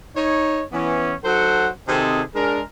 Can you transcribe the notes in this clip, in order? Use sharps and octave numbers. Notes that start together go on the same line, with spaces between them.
D#4 C#5
E3 B3 C#4
F#3 D#4 A4 C5 F#5
C3 D#3 C4 D#4 G#4 A4
G#3 D4 G#4 A#4